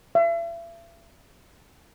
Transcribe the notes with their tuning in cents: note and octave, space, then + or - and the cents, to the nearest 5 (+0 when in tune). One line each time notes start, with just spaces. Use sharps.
E5 +40